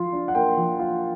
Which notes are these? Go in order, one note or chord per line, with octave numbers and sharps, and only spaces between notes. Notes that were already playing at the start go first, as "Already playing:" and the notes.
Already playing: F3 F4 C6
D4
F#5
A#3 G5
F3
F4